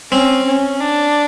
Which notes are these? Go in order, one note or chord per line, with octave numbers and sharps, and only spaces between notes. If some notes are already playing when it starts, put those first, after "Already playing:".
C4 C#4
C#4
D4